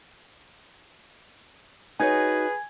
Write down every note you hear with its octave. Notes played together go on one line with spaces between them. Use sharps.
D#4 F#4 G#4 B4 C#5 G#5 G#6